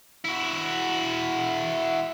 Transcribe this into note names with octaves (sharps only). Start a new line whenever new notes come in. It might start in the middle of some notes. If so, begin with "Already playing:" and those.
E4 F#4